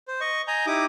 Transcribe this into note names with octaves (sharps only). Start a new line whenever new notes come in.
C5
D#5 C#6
D#5 G#5 A#5 G6
D#4 E4 G4 D6 D#6